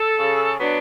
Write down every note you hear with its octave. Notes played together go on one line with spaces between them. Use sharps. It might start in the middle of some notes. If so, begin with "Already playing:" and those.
Already playing: A4
C#3
F#3 B3 D4